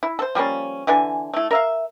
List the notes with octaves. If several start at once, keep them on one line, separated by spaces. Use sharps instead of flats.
E4
A4 C5
F3 G3 A#3 C#4
D3 E3 D4 G#5
A3 E4
A#4 E5 F5